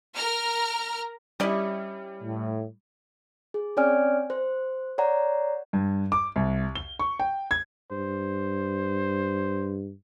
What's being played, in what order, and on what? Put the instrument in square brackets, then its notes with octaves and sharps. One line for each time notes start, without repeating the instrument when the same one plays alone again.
[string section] A#4 A#5 F6
[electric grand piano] G3 [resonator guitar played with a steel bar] C#4 E4 [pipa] G4 D5 D#5
[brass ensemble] A2
[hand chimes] G#4
C4 C#4 C#5 D5 G#5 F6
C5
C#5 D5 F#5 A#5
[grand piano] G2
D6
C2
G7
C#6
G5
G#6
[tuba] G2 [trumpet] C5